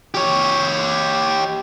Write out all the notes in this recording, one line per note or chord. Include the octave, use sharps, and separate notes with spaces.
G4 C#5